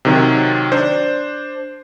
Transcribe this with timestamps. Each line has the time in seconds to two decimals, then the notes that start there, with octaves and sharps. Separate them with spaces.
0.05 C3 D#3 F#3
0.72 D4 C5